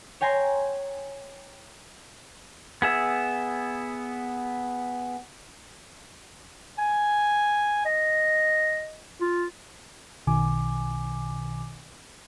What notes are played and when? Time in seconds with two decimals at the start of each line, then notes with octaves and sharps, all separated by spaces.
0.21 C#5 G5 G#5 A#5 C6
2.82 B3 G#4 E5
6.78 G#5
7.85 D#5
9.21 F4
10.27 B1 B2 D#3 G#5 D6